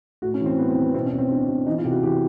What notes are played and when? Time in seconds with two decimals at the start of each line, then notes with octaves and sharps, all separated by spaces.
0.22 A2 F#4
0.34 C#4
0.40 E3
0.46 C4
0.58 A2 B3
0.70 C4
0.77 E3
0.83 B3
0.94 B2 C4
1.06 C#4
1.13 B2
1.18 C4
1.31 B2 D4
1.48 B2
1.66 E3 D#4
1.78 F4
1.84 C3 G4
1.91 F#4
2.03 E3 G4